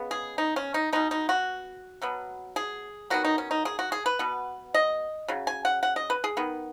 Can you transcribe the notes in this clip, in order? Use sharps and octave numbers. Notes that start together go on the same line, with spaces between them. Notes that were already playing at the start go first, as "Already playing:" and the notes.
Already playing: C#3 G#3 B3
G#4
D#4
C#4
D#4
B2 B3 D#4
D#4
F#4
B2 F#3 B3
G#4
D#3 F#3 B3 F#4
D#4
C#4
D#4
G#4
F#4
G#4
B4
B2 B3
D#5
C#3 F#3
G#5
F#5
F#5
D#5
B4
G#4
D#3 B3